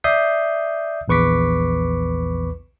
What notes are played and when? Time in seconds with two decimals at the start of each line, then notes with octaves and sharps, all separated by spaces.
0.04 D5 E5 D#6 G6 C7
1.08 A#1 E2 B4 C#6 D6 B6